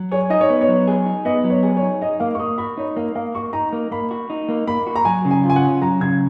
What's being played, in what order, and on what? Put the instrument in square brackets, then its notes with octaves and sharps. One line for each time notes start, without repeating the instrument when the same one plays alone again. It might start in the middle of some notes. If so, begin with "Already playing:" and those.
Already playing: [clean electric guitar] F#3
[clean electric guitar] G#4 [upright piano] C#5
[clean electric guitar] D#4 [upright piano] D#5
[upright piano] C#5
[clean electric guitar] B3
[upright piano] C#5
[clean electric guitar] F#3
G#4
D#4
[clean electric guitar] B3 [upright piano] D#5
[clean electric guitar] F#3
[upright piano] C#5
[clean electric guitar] G#4
[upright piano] C#5
[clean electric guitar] D#4
[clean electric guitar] D#4 [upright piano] D#5
[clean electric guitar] A#3 [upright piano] F5
[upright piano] C#6
[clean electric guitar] A#3 [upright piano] D#6
[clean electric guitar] F#4 [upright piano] B5
[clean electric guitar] D#4 [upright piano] C#5
[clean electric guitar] A#3 [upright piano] D#5
[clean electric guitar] A#3 [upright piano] F5
[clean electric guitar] F#4 [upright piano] C#6
[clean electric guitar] D#4 [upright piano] A#5
[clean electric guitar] A#3
[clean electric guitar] A#3 [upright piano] B5
[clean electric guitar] F#4
D#4
A#3
[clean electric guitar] A#3 [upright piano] B5
[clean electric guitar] F#4
[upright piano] A#5
[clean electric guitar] F#3 [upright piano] G#5
[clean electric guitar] C#3
[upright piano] G#5
[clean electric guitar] F4
[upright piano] G#5
F#5
[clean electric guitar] C#4
[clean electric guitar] F#3 [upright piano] A#5
[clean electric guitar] C#3 [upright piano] G#6